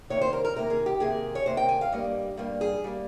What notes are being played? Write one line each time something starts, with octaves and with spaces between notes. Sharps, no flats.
C3 D#3 A#3 C#5
C5
A#4
A#4
C3 D#3 A#3 A#4
G#4
G4
C3 D#3 A#3 G#4
C#5
C3 D#3 A#3 C5
G5
G#5
F5
G2 G3 A#3 D#5
G2 G3 A#3
G#4
G3 A#3